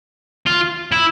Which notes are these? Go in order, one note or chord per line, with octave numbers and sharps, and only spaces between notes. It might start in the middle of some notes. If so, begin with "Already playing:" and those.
F4
E4